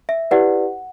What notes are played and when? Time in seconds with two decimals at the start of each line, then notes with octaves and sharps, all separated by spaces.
0.09 E5
0.31 E4 G4 B4 D5 F#5